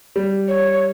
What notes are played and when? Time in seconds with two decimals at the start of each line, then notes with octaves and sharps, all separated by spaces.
0.16 G3
0.48 C#5